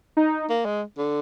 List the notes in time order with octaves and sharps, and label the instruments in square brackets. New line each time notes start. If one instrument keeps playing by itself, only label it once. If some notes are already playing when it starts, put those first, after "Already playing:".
[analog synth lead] D#4
[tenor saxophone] A#3
G#3
D3